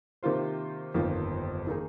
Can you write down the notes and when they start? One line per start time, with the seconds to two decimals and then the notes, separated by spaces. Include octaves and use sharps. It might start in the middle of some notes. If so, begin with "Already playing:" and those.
0.23 C3 D#3 A#3 F4 C5
0.94 G1 F2 D#3 A#3 F4
1.67 D#3 A#3 D#4 G#4